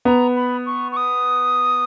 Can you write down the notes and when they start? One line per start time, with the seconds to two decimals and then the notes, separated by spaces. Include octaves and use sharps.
0.05 B3 A#5
0.36 B5
0.66 C#6
0.92 C#6
0.97 D#6